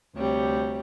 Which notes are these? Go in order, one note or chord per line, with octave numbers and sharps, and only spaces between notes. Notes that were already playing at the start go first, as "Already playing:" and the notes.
D2 C3 G3 C#5